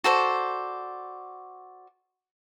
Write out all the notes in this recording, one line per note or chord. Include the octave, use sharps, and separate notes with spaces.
F#4 A4 C5 D5